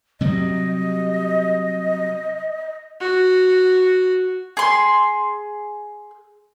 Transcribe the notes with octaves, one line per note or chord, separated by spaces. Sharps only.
C3 F#3 G3 D#5
F#4
G#4 C6